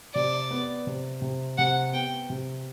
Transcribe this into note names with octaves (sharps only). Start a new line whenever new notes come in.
C3 D5
B3
C3
C3
C3 F#5
B3 G5
C3